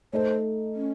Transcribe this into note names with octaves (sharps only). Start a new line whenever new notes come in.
A3 D#4 A4 C5 C#5
C#4